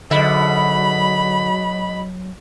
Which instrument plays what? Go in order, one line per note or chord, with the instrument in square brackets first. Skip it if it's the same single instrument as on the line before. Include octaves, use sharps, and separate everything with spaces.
[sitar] G#2 B2 E5 [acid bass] D3 [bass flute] F#3 [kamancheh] B5